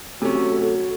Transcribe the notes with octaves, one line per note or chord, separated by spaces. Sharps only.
C3 F#3 A3 C#4 A4